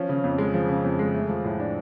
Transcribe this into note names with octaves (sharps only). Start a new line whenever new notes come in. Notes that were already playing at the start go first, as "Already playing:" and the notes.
Already playing: F3 C#4
C#3
F2
G#3
F3
C#3
F2
G#3
A3
F3
A2
D4